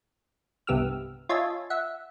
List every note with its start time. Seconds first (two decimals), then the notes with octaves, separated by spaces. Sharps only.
0.67 G1 C2 B3 G4 E6 F6
1.29 F4 C#5 D#5 E5 G#5 A5
1.70 E5 F#5